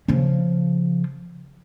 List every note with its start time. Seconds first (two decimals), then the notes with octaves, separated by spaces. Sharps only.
0.08 C#3 F3